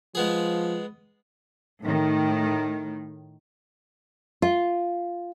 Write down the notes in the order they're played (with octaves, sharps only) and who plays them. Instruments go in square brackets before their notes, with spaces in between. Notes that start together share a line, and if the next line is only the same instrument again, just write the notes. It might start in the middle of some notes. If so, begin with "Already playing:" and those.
[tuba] F3 [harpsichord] G#3 B3 G#4
[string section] A2 D#3
[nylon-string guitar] F4